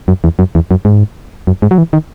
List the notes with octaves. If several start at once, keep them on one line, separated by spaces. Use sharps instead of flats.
F#2
E2
F#2
E2
F#2
G#2
F#2
G#2
F#3
E3
D#3